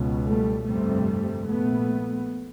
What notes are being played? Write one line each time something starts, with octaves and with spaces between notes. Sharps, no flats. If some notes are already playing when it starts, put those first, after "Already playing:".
Already playing: C#2 B2
G3 A3
G1 F2 C3 G3 A3
A#1 A#2 A3 B3